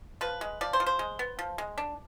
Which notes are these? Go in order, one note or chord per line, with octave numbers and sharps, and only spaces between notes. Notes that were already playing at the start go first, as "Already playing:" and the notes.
F3 B4
G#3
F3 D5
C5
F3
C5
G#3
B3
F3
G#3
D4